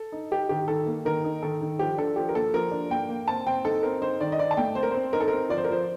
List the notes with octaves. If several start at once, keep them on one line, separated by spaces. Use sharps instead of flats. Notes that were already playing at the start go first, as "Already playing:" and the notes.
Already playing: A4
D#4
D#4 G4
D#3 G4
D#3 A4
A#3
D#3 A#4
D#4
D#3 A4
D#3
F3 G4
D4 A4
F3 G4
A#4
A#3 A4
F3 A#4
D4
A#3 G5
A#3
C4 A5
C4 G5
D#4 A4
C4 A#4
D#4 C5
D#3 D5
D#5
D#4 D5
A5
A3 G5
C4 C5
A#4
C4 C5
D#4 A#4
A4
C4 A#4
F3 D5
C5
A#4
F3 C5